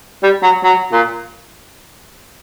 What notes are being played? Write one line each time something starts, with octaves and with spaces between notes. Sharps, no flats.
G3
F#3
F#3
A#2